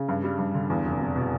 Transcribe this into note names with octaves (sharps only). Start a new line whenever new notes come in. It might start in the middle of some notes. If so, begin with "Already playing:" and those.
Already playing: C#3
G2
G3
G2
D3
E2
F1
F1
B2